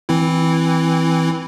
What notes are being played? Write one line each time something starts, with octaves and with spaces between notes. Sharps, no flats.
E3 C4 E4